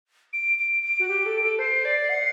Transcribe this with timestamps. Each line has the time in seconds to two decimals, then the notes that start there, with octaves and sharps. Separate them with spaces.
0.33 D7
0.59 D7
0.84 D7
1.00 F#4
1.08 G4
1.26 A4
1.42 A4
1.59 C5 C7
1.85 D5
2.09 F#5